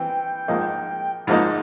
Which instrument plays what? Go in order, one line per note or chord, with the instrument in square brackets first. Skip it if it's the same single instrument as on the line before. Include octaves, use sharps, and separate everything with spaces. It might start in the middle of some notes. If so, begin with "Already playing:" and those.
Already playing: [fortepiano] E3 C4 [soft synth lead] G5
[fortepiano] G#2 F3 A#3 D#4
G#2 F3 A#3 D#4